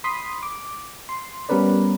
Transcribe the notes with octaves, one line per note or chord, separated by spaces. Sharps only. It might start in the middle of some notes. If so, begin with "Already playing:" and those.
B5 C6 D#6 B6
D6
C6
G3 B3 C#4 A#4 B4 D5